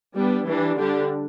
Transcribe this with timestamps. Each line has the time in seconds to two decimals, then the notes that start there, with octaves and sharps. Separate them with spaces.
0.14 G3 B3 D4
0.46 E3 G3 D4
0.77 D3 G3 D4 G4